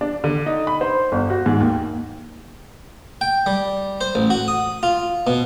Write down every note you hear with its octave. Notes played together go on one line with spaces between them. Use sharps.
D4
D3
D#4
B5
C5
G1
F#4
G#2
D#2
G5
G3
C5
A1
F#4
D#6
F4
B2